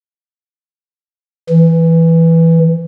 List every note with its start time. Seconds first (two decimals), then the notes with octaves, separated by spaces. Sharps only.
1.49 E3